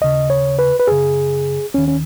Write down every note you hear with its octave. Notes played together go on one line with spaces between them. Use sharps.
D#2 C#3 D#5
C#5
B4
B4
F#2 C#3 G#4
D#2 D#3 C#4
C#4